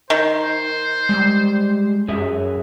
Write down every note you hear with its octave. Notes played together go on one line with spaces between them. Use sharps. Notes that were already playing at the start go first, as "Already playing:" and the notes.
D#3 C5
G3 G#3
F#2 F#3 G#4 E5